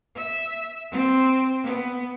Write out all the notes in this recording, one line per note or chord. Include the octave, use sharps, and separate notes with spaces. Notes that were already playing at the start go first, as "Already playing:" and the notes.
E5
C4
B3